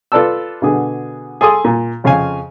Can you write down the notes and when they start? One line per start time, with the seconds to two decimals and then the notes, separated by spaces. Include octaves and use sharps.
0.12 F4 A4 B4 D5 A5 E6
0.62 B2 D3 G#4
1.41 G#4 A4 C6 D#6
1.65 A#2
2.04 F2 C#3 F3 F5 G#5